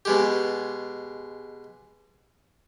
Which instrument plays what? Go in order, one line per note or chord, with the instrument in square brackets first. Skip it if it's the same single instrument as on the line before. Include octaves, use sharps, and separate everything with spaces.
[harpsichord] B2 G#3 G4